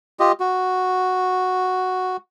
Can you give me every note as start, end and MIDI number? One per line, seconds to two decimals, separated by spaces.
0.20 0.32 65
0.20 0.32 67
0.20 0.32 75
0.40 2.17 66